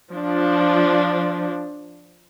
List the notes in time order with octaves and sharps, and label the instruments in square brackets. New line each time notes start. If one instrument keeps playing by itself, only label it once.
[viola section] F3 D4